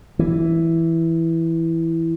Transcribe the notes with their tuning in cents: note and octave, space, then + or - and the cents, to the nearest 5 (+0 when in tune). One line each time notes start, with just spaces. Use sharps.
E3 +0